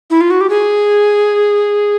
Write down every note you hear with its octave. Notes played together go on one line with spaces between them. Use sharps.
E4
F4
F#4
G4
G#4